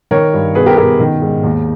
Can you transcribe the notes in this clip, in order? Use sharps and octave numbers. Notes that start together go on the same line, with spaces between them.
D#3 A#4 C#5
G2
B2 G#4 B4
G4 A#4
B2 G4 A#4
D#3
G#2
D#2